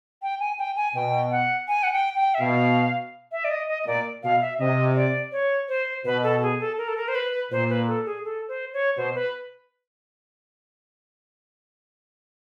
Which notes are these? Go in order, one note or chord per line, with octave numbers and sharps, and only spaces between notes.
G5
G#5
G5
G#5
B2 G5
F#5
G#5
F#5
G5
G5
E5
B2 F5
E5
D5
D#5
D#5
D#5
A#2 D5
B2 F5
E5
C3 D#5
D5
C#5
C5
B2 B4
A4
G#4
A4
A#4
A4
A#4
C5
B4
A#2 C5
B4
A4
G#4
A4
C5
C#5
B2 C5
B4